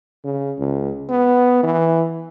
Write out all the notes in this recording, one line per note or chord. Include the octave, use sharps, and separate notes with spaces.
C#3
C#2
B3
E3